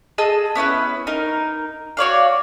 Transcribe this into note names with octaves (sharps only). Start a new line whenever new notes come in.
G#4 D#5 A5 E6
B3 C#4 E4 B4
D#4 A#4
F#4 C#5 D5 F5